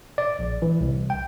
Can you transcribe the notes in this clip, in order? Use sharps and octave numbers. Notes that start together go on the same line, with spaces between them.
D5
A#1
E3
C2
G5